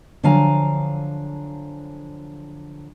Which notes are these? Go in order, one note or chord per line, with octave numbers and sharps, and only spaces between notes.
D3 F3 F#3 F5 G#5 A#5